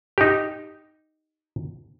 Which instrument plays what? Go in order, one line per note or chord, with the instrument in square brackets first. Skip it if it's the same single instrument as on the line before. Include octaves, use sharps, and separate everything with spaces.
[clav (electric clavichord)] D#4 G4